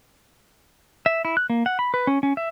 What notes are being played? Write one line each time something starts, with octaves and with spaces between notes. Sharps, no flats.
E5
E4
F#6
A#3
F#5
B5
B4
C#4
C#4
E5